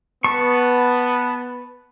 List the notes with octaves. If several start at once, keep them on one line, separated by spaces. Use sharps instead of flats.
B3 B4 A5 C#6